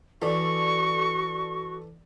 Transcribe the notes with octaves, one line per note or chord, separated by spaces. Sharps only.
E3 F#4 A4 D5 C#6